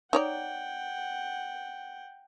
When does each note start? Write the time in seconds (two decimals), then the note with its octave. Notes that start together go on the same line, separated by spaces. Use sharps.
0.13 D#4 C#5 D5 F#5 G5